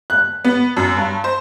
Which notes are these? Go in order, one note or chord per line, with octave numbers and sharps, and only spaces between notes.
F#6
B3
F#2
G2
C5